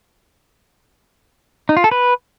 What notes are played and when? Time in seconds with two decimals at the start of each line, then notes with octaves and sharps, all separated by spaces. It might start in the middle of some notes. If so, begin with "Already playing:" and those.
1.69 D#4
1.77 F4
1.84 A4
1.91 B4